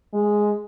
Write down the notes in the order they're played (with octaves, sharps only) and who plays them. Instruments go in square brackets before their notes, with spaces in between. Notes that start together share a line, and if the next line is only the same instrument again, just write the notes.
[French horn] G#3